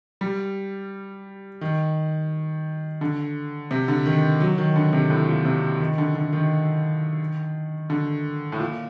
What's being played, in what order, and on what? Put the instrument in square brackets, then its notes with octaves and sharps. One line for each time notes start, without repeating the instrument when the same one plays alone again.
[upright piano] G3
D#3
D3
C3
D3
D#3
F#3
D#3
D3
C3
A2
A#2
C3
D#3
D3
D3
D#3
D3
A2
A#2